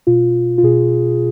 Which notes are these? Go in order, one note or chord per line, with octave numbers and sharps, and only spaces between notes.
B2 F4
F4
B2 G#4